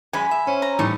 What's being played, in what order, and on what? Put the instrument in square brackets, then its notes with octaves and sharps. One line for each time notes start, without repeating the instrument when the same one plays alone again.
[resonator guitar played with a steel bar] F#2 G#3 C#4 [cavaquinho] G#5 B5
[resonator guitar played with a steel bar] E5
[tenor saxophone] C#4 [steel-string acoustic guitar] C5
[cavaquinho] A#5
[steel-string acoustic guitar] A2 G3 [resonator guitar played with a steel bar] E3 A3 D#4